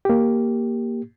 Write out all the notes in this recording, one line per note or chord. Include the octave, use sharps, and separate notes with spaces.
A#3 G4